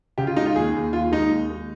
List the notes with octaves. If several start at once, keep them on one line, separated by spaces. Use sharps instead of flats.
C#3 G4
F4
G#3 D#4
F4
D#2 G#4
D#2
D#2 F4
G#3 D#4
D#2
G#3